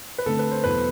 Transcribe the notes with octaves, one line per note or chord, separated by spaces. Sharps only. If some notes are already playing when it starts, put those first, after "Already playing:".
B4
D3 A3 C4 A4
B4
C5
E2 B2 F#3 B4